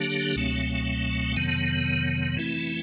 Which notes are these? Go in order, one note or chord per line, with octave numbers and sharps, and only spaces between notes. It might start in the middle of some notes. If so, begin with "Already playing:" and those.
Already playing: D3 F#3 A#3 D4 G4
C#2 B2 F#3 A3 C4
F2 C3 D#3 F#3 B3
E3 A3 C4 E4